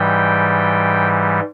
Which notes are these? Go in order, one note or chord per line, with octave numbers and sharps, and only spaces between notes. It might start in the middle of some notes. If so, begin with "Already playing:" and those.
Already playing: G#2 E3 G3 G5